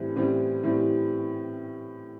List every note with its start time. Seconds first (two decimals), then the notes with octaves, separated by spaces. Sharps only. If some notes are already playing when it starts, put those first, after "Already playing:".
Already playing: A2 E3 G3 C4
0.16 A2 E3 G3 C4
0.63 A2 E3 G3 C4